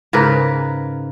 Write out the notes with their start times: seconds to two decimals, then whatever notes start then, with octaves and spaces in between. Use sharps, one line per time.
0.13 G#2 C#3 A#4 B4